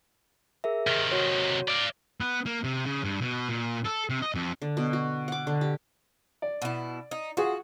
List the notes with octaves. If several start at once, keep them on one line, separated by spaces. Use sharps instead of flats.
G#4 A#4 E5
C3 D#3 F6
F#4 C#5
D5 F5
B3
A#3
C3
C#3
G2
B2
A#2
A4
C3
D#5
F2
D3
B2
F#4
F#5 D6
D3
G4
D5
B2 E4
D#4
F4 F#4 G#4